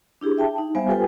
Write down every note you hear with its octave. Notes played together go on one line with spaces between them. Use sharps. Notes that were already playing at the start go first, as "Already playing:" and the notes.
D4 E4 G4 G#4
E5 G5 A5
D#4
G3 B3 C5 E5 F5 G#5
F4 G4 A4 B4 G5 G#5